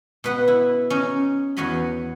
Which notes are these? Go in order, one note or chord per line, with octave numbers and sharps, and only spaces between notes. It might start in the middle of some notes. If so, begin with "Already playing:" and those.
B2 B4 F#5
E4
C#4 D#4
E2 F#4 C#5 D#5 B5